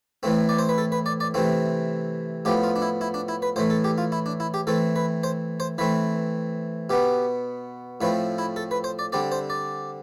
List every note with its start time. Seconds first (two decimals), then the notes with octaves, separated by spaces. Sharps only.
0.23 A2 E3 A3 C4
0.49 D5
0.59 C5
0.69 B4
0.78 A4
0.92 B4
1.06 D5
1.20 D5
1.34 C3 E3 A3 C4
2.45 A2 F3 B3 G4
2.63 F4
2.76 D4
2.82 E4
3.01 E4
3.14 D4
3.28 E4
3.42 B4
3.56 A2 E3 A3 C5
3.70 A4
3.84 G4
3.98 F4
4.12 E4
4.26 D4
4.40 E4
4.54 G4
4.67 E3 A3 C4 A4
4.96 B4
5.23 C5
5.60 C5
5.78 E3 A3 C4 B4
6.90 B2 B3 G4
8.01 A2 F3 A3 C4 B4
8.38 E4
8.56 A4
8.71 B4
8.84 C5
8.99 D5
9.12 D3 G3 C4 D5
9.32 C5
9.50 D5